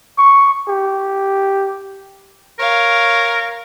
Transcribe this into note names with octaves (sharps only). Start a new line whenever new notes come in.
C#6
G4
A#4 C#5 F5